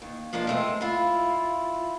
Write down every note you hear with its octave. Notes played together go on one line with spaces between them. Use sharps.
D#2
F3 G#3 A#3 D4 F4
G#3 A3 C4
E4 F4